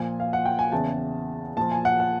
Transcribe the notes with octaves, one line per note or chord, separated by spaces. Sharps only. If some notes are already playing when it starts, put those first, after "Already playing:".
Already playing: A#2 F3 G#5
F5
F#5
G5
G#5
E2 C#3 E3 A5
A#2 F3 A5
G#5
F#5
F#5